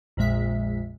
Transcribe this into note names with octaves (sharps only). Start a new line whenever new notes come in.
A#1 F2 A#2 G#3 E5 B6